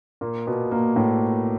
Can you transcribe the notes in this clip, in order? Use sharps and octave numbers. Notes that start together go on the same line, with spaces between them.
A#2 A#3
B2 B3
A#2 A#3
A2 A3